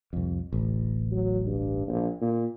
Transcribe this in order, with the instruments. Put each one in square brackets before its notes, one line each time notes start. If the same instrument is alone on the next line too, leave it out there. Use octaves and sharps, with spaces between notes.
[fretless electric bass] C2 F2
D1 A1
[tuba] F#3
G2
A#1
A#2